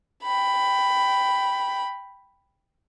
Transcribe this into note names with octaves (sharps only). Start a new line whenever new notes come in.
G5 B5